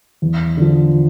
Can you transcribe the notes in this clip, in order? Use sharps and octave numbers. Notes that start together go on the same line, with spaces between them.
E2
D3 F3